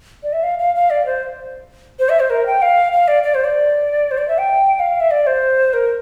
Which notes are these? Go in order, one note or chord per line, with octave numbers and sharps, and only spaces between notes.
D5
E5
F5
F5
F5
D5
C5
C5
E5
C5
A#4
G5
F5
F5
D5
D5
C5
D5
C5
D5
E5
G5
F5
E5
D5
C5
A#4